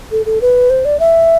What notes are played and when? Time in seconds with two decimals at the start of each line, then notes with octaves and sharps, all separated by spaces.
0.12 A4
0.26 A4
0.41 B4
0.70 C5
0.85 D5
1.00 E5